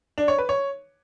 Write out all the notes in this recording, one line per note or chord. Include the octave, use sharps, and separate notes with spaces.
D4
C#5
B4
C#5